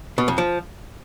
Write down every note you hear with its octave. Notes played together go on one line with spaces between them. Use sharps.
B2
F2
F3